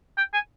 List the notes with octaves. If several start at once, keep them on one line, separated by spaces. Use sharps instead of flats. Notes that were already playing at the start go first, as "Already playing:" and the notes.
G5
G#5